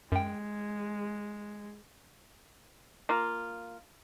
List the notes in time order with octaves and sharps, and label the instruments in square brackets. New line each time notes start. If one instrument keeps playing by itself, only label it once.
[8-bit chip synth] F#2 G5 [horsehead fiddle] G#3
[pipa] A#3 F4